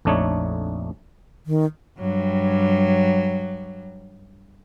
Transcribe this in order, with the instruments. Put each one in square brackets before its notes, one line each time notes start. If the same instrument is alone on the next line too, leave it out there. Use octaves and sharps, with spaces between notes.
[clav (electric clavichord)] A#1 F2 A3 D4 D#4 C#5
[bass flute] D#3
[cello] G2 F#3